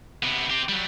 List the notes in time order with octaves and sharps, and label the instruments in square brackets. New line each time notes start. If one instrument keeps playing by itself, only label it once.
[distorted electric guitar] C3 B3
C4 G4
F#3 G3